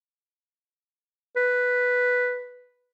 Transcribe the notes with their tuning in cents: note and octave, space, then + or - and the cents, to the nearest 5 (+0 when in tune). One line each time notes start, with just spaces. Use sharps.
B4 +0